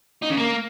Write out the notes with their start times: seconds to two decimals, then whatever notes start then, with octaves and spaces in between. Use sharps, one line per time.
0.23 D#4
0.30 C#3
0.37 A#3